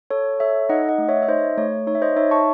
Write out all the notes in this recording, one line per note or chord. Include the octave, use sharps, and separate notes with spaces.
A4 C#5
A4 C#5 E5
D#4 D#5 F#5
D#5 F#5
A3
C#5 E5
E5
D#4 C5 D#5
A3 C#5
D#4 C#5
E5
C5 D#5
D#4 C#5 E5
A5 C#6